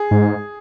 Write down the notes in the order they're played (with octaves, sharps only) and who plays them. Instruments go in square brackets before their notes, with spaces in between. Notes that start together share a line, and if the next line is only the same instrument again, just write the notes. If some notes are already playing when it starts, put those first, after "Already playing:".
Already playing: [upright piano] G#4
[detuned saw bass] G#2